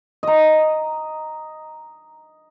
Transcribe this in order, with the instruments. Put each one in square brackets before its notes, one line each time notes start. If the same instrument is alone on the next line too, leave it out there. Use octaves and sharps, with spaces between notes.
[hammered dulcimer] D#5 A#5